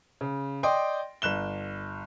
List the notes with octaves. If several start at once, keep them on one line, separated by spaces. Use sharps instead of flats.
C#3
D5 D#5 G5 C6
G1 F#6 E7 G7